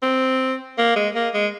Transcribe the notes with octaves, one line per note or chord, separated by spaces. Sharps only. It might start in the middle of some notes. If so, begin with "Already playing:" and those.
C4
A#3
G#3
A#3
G#3